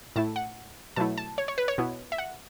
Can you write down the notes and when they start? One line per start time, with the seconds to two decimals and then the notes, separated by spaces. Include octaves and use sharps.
0.16 A2 A3 E4 A5
0.36 F#5
0.96 B2 F#3 A3 E4 A5
1.18 A5
1.38 C#5
1.48 C#5
1.58 B4
1.68 C#5
1.78 B2 B3 E4
2.12 E5
2.18 F#5